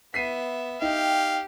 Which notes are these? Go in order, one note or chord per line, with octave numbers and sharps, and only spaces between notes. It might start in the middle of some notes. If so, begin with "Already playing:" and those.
B3 E5 B6 C7 D#7
D#4 G4 F5 G5